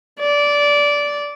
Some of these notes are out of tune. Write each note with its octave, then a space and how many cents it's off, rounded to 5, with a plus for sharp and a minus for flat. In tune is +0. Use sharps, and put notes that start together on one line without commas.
D5 -15